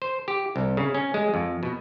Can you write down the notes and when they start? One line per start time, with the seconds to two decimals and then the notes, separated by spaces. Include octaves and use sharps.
0.02 C5
0.28 G4
0.56 C2
0.77 C#3
0.94 C#4
1.14 G#3
1.34 F2
1.63 B2